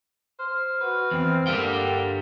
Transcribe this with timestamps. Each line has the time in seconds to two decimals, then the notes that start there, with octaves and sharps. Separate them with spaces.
0.39 C5 F6
0.81 F#4 B4
1.11 E2 C4
1.47 G2 D3 G3 A#3 G5